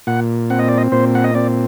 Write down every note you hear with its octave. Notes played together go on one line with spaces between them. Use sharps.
A#2 F#5
C4 F#5
D#5
D5
D#5
A#2 C5
F#5
D#5
C4 D5